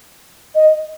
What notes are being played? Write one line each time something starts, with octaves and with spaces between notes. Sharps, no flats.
D#5